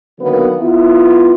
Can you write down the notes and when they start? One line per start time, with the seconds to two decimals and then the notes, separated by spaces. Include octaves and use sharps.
0.21 D3 D#3 F#3 A#3 B3
0.60 B3 E4 F4